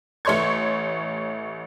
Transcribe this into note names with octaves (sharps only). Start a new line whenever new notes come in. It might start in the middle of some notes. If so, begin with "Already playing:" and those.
A1 A3 C#5 C6 C#6 G#6